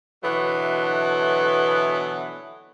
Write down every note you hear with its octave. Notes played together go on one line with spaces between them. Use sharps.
B2 D3 E3 F#3 A3 B3